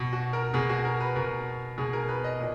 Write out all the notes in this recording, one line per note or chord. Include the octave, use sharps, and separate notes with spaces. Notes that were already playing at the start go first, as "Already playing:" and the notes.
Already playing: B2
F#4
A#4
B2 G#4
F#4
A#4
B4
B2 A#4
B2 G#4
A#4
B4
D#5
A#2